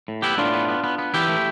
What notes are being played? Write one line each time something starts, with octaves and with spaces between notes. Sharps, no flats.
A2
B3 E4 G4
A2 D4 F4
B3
B3
B3
B3
E3 E4 G4
A3